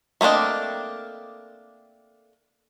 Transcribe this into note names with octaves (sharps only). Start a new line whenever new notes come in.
A3 A#3 C4 D4 D#5